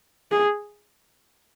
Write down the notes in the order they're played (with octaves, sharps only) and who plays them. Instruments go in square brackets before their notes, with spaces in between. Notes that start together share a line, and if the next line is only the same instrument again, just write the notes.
[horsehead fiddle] G#4